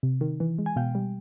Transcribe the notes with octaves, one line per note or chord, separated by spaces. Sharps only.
C3
D#3
E3
G#3
G#5
B2 F5 G5
G3